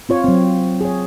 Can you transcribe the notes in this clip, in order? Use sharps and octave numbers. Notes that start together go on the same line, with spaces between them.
C4 F4 C#5
F#3 C4
G#4 C#5